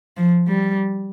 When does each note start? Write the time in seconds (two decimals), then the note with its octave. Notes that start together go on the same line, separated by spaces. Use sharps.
0.17 F3
0.48 G3